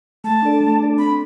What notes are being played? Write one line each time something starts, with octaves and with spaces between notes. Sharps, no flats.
A3 A5
D4 A4 D5
A3
D4 A4 D5
C4 B5